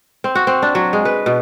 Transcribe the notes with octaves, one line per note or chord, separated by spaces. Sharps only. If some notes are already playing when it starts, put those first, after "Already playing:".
C4
F#4
C4
D4
F#3
G#3
B4
B2